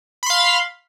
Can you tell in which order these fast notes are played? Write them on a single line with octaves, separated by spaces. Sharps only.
B5 C6 F5